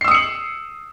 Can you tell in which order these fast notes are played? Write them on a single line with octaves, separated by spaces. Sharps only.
C7 E6 D#6 C#7 F#7